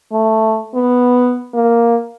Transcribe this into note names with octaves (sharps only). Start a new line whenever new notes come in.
A3
B3
A#3